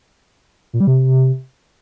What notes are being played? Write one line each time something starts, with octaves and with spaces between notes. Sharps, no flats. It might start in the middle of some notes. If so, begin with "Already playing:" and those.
A#2
G3
C3